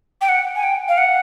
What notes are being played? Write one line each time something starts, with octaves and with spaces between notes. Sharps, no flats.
G5
F#5
G#5
G5
F5
F#5